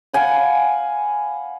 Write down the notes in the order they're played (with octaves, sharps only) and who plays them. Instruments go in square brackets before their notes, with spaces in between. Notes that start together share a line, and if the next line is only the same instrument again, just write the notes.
[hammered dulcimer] F5 F#5 G#5 B5